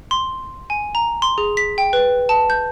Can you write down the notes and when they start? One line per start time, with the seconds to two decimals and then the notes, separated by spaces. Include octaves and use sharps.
0.11 C6
0.70 G#5
0.95 A#5
1.22 C6
1.38 G#4
1.57 B6
1.78 G5
1.93 B4
2.29 A5
2.50 G6